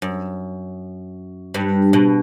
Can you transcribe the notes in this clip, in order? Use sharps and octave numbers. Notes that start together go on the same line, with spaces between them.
F#2
G2
B2